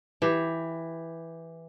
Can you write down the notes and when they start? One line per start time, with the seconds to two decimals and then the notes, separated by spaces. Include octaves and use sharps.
0.22 E3 G4